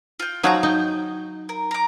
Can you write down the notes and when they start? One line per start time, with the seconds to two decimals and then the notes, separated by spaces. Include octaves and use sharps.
0.20 F4 G5
0.43 F3 F#3 D#4 E5 F#5 A#5
0.63 D#4 G5
1.49 A#4
1.71 A#4 D6